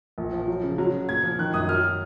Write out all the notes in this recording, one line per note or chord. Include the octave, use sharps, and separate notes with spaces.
A#1
F3
F#3
C#3
F#3
C#3
A#2 G#6
F3
D#3 F#6
F#2 D#6
F#3 F6